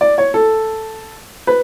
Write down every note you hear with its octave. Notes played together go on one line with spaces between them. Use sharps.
D5
C#5
A4
B4